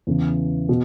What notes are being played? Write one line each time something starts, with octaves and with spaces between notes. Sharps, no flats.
E2 C#3 E3
B2